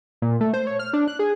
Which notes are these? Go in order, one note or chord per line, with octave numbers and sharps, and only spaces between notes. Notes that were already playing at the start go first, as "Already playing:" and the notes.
A#2
A3
C5
C#5
F6
D4
F#6
G#4